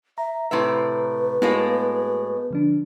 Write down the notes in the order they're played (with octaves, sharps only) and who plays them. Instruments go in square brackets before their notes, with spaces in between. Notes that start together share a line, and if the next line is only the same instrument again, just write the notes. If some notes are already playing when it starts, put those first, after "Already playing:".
[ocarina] E5 [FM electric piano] A#5
[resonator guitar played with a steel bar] A2 C3 E5 [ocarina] B4
[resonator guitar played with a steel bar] A2 G#3 A#3 [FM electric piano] B3 F#4
[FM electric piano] D3 F3 D4